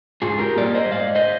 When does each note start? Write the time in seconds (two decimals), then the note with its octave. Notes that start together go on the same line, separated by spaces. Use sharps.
0.22 G#2 F4 G#4
0.39 G4 A#4
0.56 G3 A#3 A#4 D5
0.75 C5 D#5
0.92 G#2 D5 F5
1.15 C5 D#5